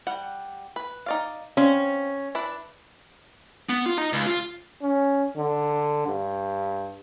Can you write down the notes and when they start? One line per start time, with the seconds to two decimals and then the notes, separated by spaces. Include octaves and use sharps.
0.07 G3 F#5
0.76 B4
1.06 D#4 D5 F5
1.57 C4 C#4 F5
2.35 D4 E4 B4
3.69 B3
3.86 F4
3.98 D#5 A#5
4.13 C#2
4.27 F4
4.82 C#4
5.37 D3
6.07 G2